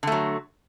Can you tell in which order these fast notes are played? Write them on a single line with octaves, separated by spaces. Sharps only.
D3 A3 F#3